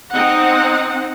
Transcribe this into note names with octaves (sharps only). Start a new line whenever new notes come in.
C4 D#4 F#5